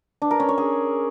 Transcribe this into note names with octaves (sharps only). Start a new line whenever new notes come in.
D4
A#4
C#4
C#5
G#4